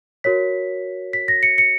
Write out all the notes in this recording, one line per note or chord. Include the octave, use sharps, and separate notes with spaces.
F#4 A#4 C#5 B6
B6
A#6
C#7
C#7